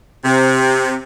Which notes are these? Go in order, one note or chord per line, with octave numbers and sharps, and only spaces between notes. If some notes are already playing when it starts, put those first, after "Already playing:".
C3